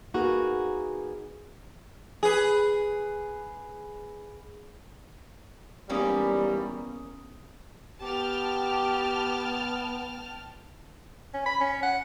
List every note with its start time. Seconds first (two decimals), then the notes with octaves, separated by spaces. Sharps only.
0.14 A#3 B3 D#4 F#4 G#4 A#4
2.23 G#4 B4
5.89 G#2 E3 G3 A#3 B3 C#4 A#4 D#6
8.02 B3 G4 G5 A5 F6
11.34 C#4
11.46 B5
11.60 C#4
11.83 F#5